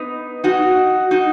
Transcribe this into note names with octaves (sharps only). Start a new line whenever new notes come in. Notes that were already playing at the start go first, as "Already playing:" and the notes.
Already playing: B3 D#4
D#4 F#4
D#4 F#4